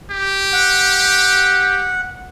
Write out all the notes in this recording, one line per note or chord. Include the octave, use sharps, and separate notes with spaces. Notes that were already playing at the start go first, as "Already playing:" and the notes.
G4
F#5